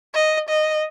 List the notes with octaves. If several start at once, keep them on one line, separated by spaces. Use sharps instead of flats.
D#5
D#5